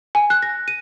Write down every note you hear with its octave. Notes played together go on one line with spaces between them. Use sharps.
G#5
F#6
A#6
D#7